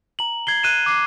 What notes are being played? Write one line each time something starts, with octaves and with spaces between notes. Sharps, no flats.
A#5 F#7
G#6 C7 G7
F#6 D#7 E7
D6 C7